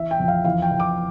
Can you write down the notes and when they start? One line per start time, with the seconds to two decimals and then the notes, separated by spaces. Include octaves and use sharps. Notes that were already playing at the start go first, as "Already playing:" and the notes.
Already playing: E3 E5
0.11 G5
0.20 F2
0.28 F5
0.45 E3 F5
0.62 G5
0.71 E3
0.80 D6